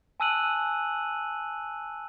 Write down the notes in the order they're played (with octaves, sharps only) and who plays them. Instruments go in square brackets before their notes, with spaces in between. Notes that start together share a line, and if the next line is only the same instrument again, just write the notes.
[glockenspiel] G#5 A5 E6 F#6 D#7 F#7